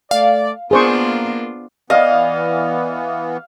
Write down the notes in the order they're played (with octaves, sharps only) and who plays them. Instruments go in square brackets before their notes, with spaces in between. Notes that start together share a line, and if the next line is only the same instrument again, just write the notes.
[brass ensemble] A3 D5 [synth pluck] F5
[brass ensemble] A#3 [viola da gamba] B3 D4 F4 [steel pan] G#4 C5 C#6
[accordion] E3 B3 [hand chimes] D5 [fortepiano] D#5 [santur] F5